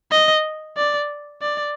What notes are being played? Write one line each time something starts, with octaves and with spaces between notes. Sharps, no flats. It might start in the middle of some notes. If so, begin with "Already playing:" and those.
D#5
D5
D5